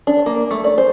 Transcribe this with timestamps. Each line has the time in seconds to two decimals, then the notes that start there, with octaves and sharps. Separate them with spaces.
0.07 D4
0.26 A#3
0.51 A3
0.64 D5
0.78 C5